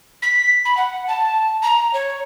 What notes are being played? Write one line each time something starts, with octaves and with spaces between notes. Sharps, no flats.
B6
B5
F#5
A5
A#5
C#5